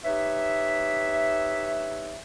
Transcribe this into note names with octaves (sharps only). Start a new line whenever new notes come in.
D#4 G4 B4 C#5 E5